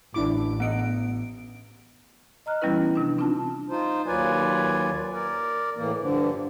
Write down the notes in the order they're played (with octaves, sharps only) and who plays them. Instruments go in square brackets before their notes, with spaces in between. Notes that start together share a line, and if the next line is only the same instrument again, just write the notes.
[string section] A1 [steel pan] D4 E4 D6
[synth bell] B3 D7 [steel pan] D#5 F#5
[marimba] D#5 A#5 F6 F#6
E3 G3 B3 C#4 E4 B4
C3 F3 D4
C4 D4 D#4 F4 A5
[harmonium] D#4 F4 C5
D#2 F#3 F4 B4 D5 G#5
A#4 D5
A2 E3 A#3
G2 D3 F3